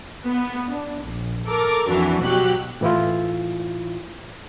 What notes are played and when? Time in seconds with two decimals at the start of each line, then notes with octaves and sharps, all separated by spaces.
0.24 B3
0.68 D4
1.03 A#1
1.47 A4 A#4 D6
1.88 F2 E3 D4 F#4
2.21 B2 F#3 F#4 G4 F#6
2.81 A2 E3 E4 F4